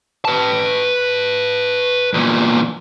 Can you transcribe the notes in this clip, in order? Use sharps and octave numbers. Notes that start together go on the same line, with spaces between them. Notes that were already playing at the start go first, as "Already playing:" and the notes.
B4 A5
E2 A#2